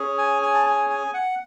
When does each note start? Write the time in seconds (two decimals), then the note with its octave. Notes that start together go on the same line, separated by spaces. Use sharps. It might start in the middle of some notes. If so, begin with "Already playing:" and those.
Already playing: C#4 G#4
0.18 G#5
0.42 G#5
0.55 A5
0.66 G#5
0.90 G#5
1.14 F#5